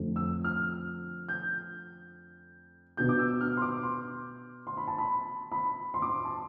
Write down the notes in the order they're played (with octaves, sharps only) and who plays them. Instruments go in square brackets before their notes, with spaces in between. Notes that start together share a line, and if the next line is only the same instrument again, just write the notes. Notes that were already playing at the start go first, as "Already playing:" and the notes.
Already playing: [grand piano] F2 D3 A3
E6
F6
G6
B2 B3 D4 G6
D6
E6
F6
C6
D6
C6
C6
B5
A5
B5
B5
C6
D6
C6
A5